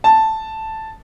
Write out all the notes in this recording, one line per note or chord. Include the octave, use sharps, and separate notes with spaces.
A5